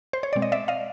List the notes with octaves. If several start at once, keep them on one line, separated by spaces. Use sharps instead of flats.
C5
C#5
B2 G#3 C4 D5
D#5
D5 E5
D#5 F5